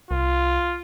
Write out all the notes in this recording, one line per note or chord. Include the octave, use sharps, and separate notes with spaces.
C2 F4